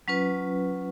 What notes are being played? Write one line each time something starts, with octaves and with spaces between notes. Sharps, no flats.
F#3 C#4 F4 B4